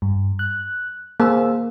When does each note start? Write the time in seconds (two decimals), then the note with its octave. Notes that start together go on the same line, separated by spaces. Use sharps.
0.02 G2
0.39 F#6
1.20 A#3 G#4 C5 E6